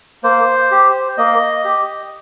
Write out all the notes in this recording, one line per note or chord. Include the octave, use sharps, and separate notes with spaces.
A#3 C5
G4
A#3 D#5
G4